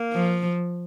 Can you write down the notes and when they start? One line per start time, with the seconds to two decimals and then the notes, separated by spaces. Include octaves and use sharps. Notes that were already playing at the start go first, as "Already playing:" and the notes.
Already playing: A#3
0.13 F3